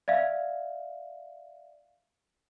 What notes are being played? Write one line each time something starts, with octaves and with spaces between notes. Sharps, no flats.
D5 E5 F5